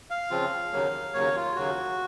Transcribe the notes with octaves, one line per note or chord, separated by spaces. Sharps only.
F5
C#3 F3 C4 F4
D#2 C#3 F#3 A#3
D#2 C#3 F#3 A#3 C#5
F4
D#2 C#3 F#3 A#3 F#4